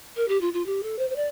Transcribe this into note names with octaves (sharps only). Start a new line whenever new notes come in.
A#4
G4
F4
F4
G4
A4
C5
C5
D5